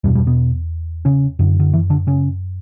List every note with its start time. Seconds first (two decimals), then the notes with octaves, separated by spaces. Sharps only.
0.04 E2 G2 B2 G3
0.15 G2 G3
0.27 B2 B3
1.05 C#3 C#4
1.39 F#2 D3
1.59 D3
1.73 E3
1.90 D3 D4
2.07 C#3 C#4